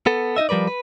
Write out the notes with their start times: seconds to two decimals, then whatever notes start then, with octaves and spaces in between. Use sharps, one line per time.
0.06 B3 A4
0.36 D#4 F4 D#5 E5
0.49 F3 G3 A#4 B4 D5
0.67 B4